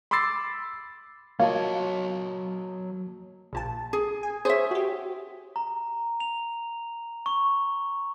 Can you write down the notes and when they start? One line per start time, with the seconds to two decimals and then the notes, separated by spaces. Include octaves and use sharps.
0.11 B5 C6 D6 E6 A6 C7
1.40 F#3 A#3 F4 F#4 C#5 D#5 A5
3.53 A#1 A#2 A5
3.93 G#4
4.23 G#5
4.45 G#4 C5 C#5 E5
4.71 F#4 G4
5.56 A#5
6.20 F7
7.26 C#6